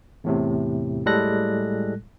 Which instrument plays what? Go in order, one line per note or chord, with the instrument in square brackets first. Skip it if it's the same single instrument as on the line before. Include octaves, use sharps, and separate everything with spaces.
[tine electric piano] E2 A2 C3
A2 G3 G#3 A4 F#6 A#6